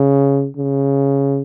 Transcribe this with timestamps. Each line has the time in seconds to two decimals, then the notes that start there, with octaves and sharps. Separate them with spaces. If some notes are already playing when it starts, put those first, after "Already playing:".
Already playing: C#3
0.57 C#3